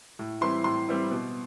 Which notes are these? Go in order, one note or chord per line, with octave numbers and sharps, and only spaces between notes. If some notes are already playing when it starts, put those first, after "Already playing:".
A2
E3 G3 C4 E4 C6
A2 C6
E3 G3 C4 E4
B2